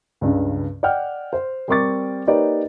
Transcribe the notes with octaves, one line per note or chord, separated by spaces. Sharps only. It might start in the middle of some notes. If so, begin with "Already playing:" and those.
C#2 G2 C#3
D5 D#5 F#5 G5 F6
C5
G3 C4 A#4 C#6 D6 A6
A#3 D#4 G4 B4 C#5 D5